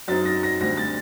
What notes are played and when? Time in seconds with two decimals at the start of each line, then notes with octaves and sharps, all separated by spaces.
0.08 F#2 F#3 C4 D#4 A6
0.25 A#6
0.43 A#6
0.61 D2 D3 G3 C4 A#6
0.77 A6